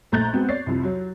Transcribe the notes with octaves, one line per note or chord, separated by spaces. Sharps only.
A#1 A3 A#5 F#6 G6 A6
G#3 B3 C4 F#4
C#5 D5 A6 C7
C2 F2
F#3